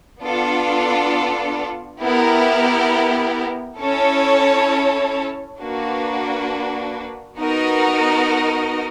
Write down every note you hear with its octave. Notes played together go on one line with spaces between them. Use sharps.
B3 D4 F4 A4 D5
B3 E4 G4 A#4
C#4 E4 A4 C#5
A#3 D4 F#4 B4
B3 D#4 F#4 A#4 D#5